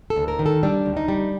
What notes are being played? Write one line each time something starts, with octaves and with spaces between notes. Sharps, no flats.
A4
D2
A#4
D#3
A4
G3 D4
D2
D#4
G3